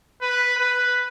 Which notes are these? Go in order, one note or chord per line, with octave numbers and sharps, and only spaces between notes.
B4
B4